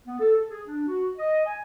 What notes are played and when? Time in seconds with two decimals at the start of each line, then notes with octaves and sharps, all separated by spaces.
0.07 B3
0.20 A4
0.36 A4
0.50 G#4
0.67 D4
0.87 F#4
1.18 D#5
1.46 G#5